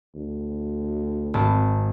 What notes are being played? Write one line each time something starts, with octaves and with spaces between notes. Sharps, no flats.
D2
G#1 A5